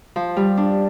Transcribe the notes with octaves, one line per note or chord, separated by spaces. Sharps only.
F3
G3
D4